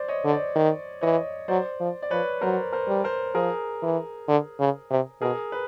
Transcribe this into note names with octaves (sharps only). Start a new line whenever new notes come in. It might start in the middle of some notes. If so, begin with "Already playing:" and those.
Already playing: C5 D5
C#5 D#5
D3
C5 D5
D#3
E3 C#5 D#5
F#3 C5 D5
F3
D5
F3 B4 C#5
F#3 A#4 C5
A#4 C5
G3
A#4 C5
F3 G#4 A#4
E3
D3
C#3
C3
B2 G#4 A#4
B4